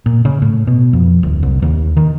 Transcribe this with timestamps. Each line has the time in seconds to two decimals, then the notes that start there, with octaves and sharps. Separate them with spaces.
0.06 A#2
0.25 C#3
0.42 A2
0.67 B2
0.93 F2
1.23 D1
1.43 C2
1.62 D#2
1.97 D#3